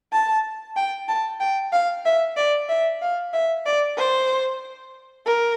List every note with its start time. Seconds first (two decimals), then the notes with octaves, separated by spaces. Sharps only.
0.13 A5
0.76 G5
1.08 A5
1.40 G5
1.72 F5
2.05 E5
2.37 D5
2.69 E5
3.02 F5
3.33 E5
3.66 D5
3.98 C5
5.26 A#4